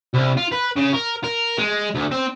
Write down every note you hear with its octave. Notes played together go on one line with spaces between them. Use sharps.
C2
F4
B4
C#3
A#4
A#4
G#3
D2
C4